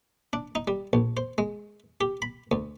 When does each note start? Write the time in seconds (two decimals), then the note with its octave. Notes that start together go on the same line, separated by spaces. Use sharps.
0.33 D4
0.55 D#4
0.67 G3
0.93 A#1
1.17 C5
1.38 G#3
2.01 G4
2.22 B5
2.51 D2